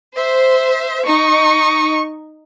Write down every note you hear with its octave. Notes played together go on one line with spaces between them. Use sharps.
C5 E5
D#4 C#6